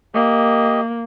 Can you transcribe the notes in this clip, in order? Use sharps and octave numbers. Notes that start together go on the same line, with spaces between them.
A#3 G4 D#5